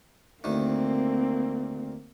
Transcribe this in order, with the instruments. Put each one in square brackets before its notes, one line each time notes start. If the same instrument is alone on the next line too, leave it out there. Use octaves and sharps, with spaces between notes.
[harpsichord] D2 D#3 [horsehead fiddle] A#3 C4